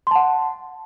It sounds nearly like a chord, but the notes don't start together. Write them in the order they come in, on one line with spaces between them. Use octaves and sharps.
C6 A5 F#5